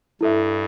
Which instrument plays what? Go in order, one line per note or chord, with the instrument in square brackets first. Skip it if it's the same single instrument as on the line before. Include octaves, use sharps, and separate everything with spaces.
[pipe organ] G2 [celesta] E4 A4 E5